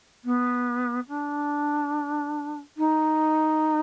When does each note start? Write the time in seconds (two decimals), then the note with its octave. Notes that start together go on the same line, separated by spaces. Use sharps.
0.24 B3
1.08 D4
2.77 D#4